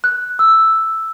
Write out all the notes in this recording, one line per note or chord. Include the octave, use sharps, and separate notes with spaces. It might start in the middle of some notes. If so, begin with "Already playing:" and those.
F#6
E6